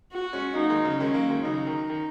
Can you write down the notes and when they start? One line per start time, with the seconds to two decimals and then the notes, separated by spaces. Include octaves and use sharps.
0.11 F#4
0.33 G#3 C#4
0.55 F#3 A#3 D#4
0.70 D#3 G#3
0.85 C#3 F#3
1.00 D#3 G#3 C#4
1.14 F#3 A#3
1.29 D#3 G#3
1.44 C#3 F#3 D#4
1.67 D#3
1.89 D#3